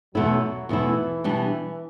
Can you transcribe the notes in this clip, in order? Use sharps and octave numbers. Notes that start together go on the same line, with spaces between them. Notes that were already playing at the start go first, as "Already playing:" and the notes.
E2 B2 F#3 A3 E4
E2 B2 E3 A3 E4
B2 G3 D4